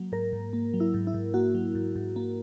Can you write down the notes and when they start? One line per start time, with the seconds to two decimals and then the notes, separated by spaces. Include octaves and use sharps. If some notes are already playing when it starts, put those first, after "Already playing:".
Already playing: F#3 A#3
0.12 G#2 A#4
0.33 G#2
0.53 A#3
0.74 F#3
0.80 E4
0.94 G#2
1.07 E4
1.14 G#2
1.34 A#3 F#4
1.55 F#3
1.75 G#2
1.96 G#2
2.16 A#3